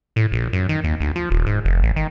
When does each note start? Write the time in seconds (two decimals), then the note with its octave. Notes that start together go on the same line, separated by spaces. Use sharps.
0.16 A2
0.32 A#1
0.53 F#2
0.69 D#3
0.84 D#2
1.01 D2
1.16 F3
1.30 D#1
1.46 G#2
1.65 F1
1.82 A1
1.96 D#3